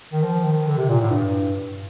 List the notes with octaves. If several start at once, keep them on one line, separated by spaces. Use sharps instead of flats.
D#3
F3
D#3
D3
C3
A#2
A2
G2